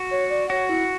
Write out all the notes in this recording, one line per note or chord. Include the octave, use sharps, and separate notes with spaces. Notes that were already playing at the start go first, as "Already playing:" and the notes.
Already playing: F#4
C#5
D5
F#4 C#5
E4